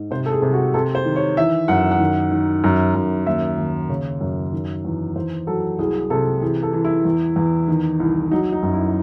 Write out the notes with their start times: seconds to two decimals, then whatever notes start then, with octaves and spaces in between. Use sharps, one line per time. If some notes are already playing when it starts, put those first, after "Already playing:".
Already playing: G#2
0.11 C3 C5
0.26 A4
0.32 G#4
0.42 C3
0.53 F#4
0.74 C3 A4
0.95 C5
1.05 D#3
1.16 C#5
1.37 E3 E5
1.68 F#2 F#5
1.91 F#5
2.00 D#3
2.31 D#3
2.64 F#2
2.95 F#2
3.26 D#2 E5
3.58 D#2
3.89 C#3 C#5
4.21 F#2
4.53 D#3
4.85 E2
5.16 E2 C5
5.47 F#3 A4
5.79 C2 G#4
6.10 C3 A4
6.42 E3 G#4
6.63 A4
6.73 E3
6.85 E4
7.05 E2
7.36 E2
7.68 D#3
8.00 C2
8.31 F#3 D#4
8.52 D#4
8.63 F#2
8.74 E4